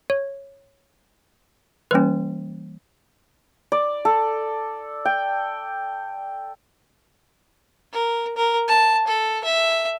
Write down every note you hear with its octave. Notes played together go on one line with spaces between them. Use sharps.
C#5
E3 G3 A#3 C#4 B4
D5
A4
G5
A#4
A#4
A5
A4
E5